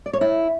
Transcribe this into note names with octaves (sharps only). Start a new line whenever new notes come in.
D5
C#5
E4